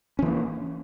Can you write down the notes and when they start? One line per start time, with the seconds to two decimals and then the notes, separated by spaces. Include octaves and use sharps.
0.19 C#4
0.22 E3
0.26 A#3